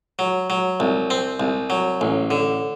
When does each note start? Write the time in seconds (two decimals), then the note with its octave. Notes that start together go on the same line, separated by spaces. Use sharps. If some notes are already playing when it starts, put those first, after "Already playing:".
0.19 F#3
0.50 F#3
0.80 C2
1.10 C4
1.40 C2
1.70 F#3
2.01 A1
2.31 D3